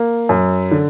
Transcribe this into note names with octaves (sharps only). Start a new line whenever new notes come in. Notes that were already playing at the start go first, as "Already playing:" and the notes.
Already playing: A#3
F#2
D3